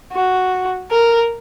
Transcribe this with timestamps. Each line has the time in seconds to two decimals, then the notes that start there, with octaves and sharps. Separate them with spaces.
0.12 F#4
0.91 A#4